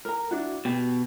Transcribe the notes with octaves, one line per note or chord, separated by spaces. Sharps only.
A#4 A#5
D4 E4 F#4
B2 G4